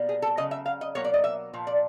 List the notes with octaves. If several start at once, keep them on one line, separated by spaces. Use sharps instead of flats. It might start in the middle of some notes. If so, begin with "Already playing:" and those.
Already playing: B2 G3 A#3
G#4
A4
C#3 F#3 D#5
E5
F5
D#5
B2 F#3 A#3 C#5
D5
D#5
E5
A#2 F3
D5